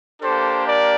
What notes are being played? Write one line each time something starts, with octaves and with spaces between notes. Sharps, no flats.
A#3 D4 G4 A4 C5
A#4 D5